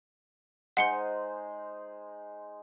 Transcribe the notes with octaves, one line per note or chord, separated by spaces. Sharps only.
G#3 D#4 C5 F#5 C#7 G7